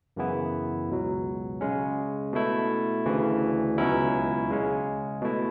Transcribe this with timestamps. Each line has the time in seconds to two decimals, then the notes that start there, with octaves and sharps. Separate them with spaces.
0.17 F#2 C#3 E3 B3 E4
0.89 C#2 B2 F#3
1.61 C#3 G#3 C#4
2.33 B2 A3 E4
3.06 D2 C#3 E3
3.78 C#2 B2 F#3 C#4 E4
4.50 C#3 G#3 C#4
5.22 B2 A3 E4